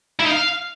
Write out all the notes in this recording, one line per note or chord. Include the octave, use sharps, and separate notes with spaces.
E4
D#4
F5